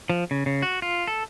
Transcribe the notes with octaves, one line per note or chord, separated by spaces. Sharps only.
F3
C#3
C#3
F#4
F4
A4